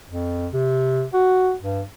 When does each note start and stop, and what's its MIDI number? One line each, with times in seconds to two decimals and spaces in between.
0.10 0.48 41
0.53 1.04 48
1.13 1.53 66
1.61 1.82 43